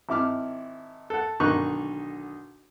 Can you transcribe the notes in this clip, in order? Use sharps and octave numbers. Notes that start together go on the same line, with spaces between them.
G#1 E4 D6 F6
A4 F#5
B1 D3 D#3 D#4 C#6 F#6